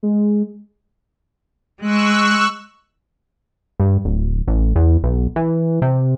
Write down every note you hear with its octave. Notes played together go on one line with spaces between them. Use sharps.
G#3
G#3 C#6 E6 F#6
G2
D1
A1
E2
B1
E3
C3